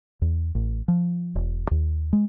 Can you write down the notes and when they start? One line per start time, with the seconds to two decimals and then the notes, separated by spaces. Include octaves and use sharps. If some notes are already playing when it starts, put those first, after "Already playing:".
0.22 E2
0.55 A1
0.88 F3
1.35 E1
1.71 D#2
2.13 G#3